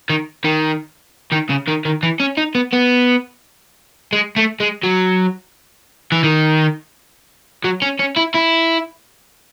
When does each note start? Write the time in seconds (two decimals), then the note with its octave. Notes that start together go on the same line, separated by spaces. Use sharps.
0.10 D#3
0.45 D#3
1.32 D#3
1.50 C#3
1.68 D#3
1.85 D#3
2.03 E3
2.20 C#4
2.37 D#4
2.55 B3
2.73 B3
4.13 G#3
4.37 A3
4.60 G#3
4.84 F#3
6.12 E3
6.24 D#3
7.64 F#3
7.82 C#4
7.99 C#4
8.16 E4
8.34 E4